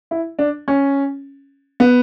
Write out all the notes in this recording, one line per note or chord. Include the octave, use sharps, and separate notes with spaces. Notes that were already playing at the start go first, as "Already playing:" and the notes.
E4
D4
C#4
B3